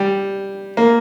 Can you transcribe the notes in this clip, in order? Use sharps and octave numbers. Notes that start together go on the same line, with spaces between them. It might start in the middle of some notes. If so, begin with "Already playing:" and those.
Already playing: G3
A#3